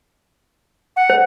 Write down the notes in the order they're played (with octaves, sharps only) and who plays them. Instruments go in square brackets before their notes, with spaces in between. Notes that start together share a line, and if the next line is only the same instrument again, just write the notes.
[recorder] F#5
[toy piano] C5